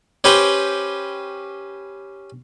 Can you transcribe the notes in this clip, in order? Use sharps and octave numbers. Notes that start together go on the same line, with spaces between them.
C#4 G4 B4 C5 G5